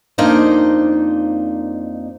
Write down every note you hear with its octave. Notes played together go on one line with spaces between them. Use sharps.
F2 A#3 D4 D#4 C5 D#5